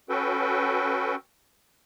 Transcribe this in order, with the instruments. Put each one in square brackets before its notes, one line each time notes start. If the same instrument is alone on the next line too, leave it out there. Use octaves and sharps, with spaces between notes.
[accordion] C#4 F#4 A4 B4 G5